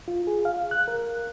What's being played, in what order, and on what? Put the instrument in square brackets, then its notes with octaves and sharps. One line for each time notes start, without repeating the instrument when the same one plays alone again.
[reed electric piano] F4
G#4
F5
F#6
A#4